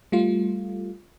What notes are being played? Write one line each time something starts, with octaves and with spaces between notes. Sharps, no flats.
G3 A3 F4